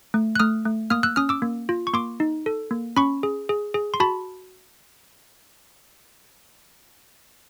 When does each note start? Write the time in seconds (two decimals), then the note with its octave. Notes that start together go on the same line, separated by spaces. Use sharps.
0.14 A3
0.35 F#6
0.39 A3 D#6 F6
0.65 A3
0.90 A#3 D#6 F6
1.03 E6 F#6
1.16 C#4 D#6 F6
1.29 D6 E6
1.42 A#3
1.69 F4
1.87 C#6
1.93 A#3 C6 D6
2.20 D#4
2.46 A4
2.71 A#3
2.97 C#4 B5 C#6
3.23 G#4
3.49 G#4
3.74 G#4
3.94 C6
4.00 F#4 A5 B5